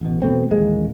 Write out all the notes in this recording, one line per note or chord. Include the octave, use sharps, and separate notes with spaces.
A1 B2
E1 B2 A3 C4
D#1 A1 G#3 A#3